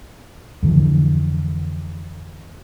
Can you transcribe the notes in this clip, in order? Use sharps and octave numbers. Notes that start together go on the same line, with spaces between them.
F2 D3 E3